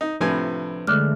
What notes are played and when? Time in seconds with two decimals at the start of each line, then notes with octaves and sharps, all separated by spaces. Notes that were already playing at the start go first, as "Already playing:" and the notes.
0.01 D#4
0.21 A2 C3 F3 D4 B4 G#5
0.87 D3 G#3 A3 D6 F6